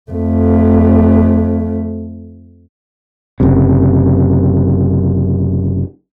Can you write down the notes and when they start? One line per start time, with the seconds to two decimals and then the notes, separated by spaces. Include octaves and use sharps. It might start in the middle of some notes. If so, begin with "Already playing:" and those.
0.11 F2 A3
3.40 F#1 F#2 C3